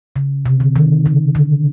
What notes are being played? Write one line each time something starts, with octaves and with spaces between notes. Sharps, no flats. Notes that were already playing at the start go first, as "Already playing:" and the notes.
C#3
C3
D3
D#3
C#3
D3